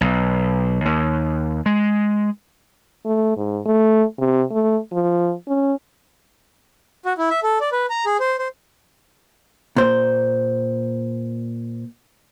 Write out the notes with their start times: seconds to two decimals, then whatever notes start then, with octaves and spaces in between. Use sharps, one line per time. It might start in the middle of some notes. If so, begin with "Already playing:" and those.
0.01 B1
0.85 D#2
1.66 G#3
3.05 A3
3.36 G#2
3.66 A3
4.18 C3
4.51 A3
4.92 F3
5.48 C#4
7.06 F#4
7.18 E4
7.30 E5
7.43 A4
7.61 D5
7.72 B4
7.90 A#5
8.06 G#4
8.20 C5
8.39 C5
9.76 A#2 C5